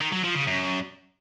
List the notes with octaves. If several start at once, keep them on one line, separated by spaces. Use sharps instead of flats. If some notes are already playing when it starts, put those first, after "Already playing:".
D#3
F#3
F3
C#3
F#2